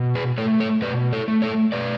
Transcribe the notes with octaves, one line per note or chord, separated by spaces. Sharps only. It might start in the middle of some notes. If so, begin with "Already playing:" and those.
Already playing: B2
G#4 B4
A3 A4 C#5
A4 C#5
B2 B4 D5
A4 C#5
A3
A4 C#5
B2 B4 D5